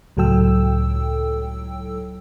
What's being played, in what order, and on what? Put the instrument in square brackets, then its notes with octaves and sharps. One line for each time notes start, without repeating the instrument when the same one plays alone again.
[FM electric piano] C#2 A2 F#3 A4 G5 E6